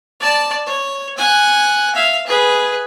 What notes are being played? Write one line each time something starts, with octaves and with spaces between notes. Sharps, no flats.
D5 A5
C#5
F#5 G#5
E5 F5
G#4 B4